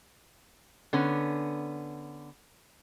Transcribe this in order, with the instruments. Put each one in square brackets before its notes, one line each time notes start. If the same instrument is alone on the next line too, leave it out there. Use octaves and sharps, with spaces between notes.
[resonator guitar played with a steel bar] D3 B3 C#4